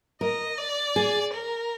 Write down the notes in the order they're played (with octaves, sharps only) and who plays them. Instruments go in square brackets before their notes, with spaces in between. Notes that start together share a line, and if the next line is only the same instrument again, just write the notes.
[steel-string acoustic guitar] A#4 [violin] D#5
[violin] D5
[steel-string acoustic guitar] G#4
[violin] A#4